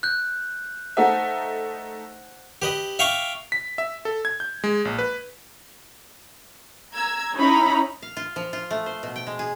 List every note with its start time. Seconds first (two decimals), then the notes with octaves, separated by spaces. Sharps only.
0.03 F#6 G6
0.97 A3 D#4 C5 E5 F#5 A5
2.62 G4 B4 D#5
2.99 E5 F5 G5 C#6 D6
3.52 B6
3.78 E5
4.05 A4
4.25 G#6
4.40 G6
4.64 G#3
4.85 A#1
4.99 B4
6.94 A#5 E6 G#6
7.36 C#4 D#4 E4 A#5 B5
8.02 F5
8.17 F4
8.36 F3
8.53 F4
8.71 A3
8.86 C5
9.03 B2
9.16 G5
9.27 G#3
9.39 G#4